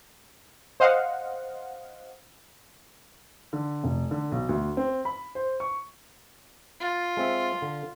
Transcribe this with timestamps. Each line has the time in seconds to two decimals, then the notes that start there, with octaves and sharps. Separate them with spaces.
0.80 C5 D#5 F5 F#5
3.53 D3
3.84 F1
4.11 D3
4.32 B1
4.49 D2
4.77 C4
5.05 B5
5.35 C5
5.60 C#6
6.81 F4
7.17 G#3 C4 E5
7.62 D3